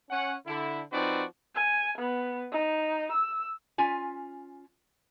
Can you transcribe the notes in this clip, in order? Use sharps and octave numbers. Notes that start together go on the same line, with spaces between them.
C#4 F#5
D3 E4
F3 C4 D#4 F#4 B4 D5
G#5
B3
D#4
E6
C#4 F4 G#5